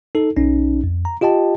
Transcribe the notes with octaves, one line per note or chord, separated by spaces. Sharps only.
D#4 A4
B1 C#4 D#4
F2
A#5
F4 G4 D#5 G5 A5